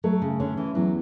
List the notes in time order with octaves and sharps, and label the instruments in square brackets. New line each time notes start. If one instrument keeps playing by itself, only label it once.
[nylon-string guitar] F#3 [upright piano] A3
[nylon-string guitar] C#3
[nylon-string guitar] D3 [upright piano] C#4
[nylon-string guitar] E3
[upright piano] E2 [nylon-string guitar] F#3